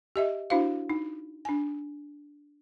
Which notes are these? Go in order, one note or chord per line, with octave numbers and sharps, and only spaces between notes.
G4 D#5 E5
D4 E4 F#4 C5 F5
D#4
D4 G#5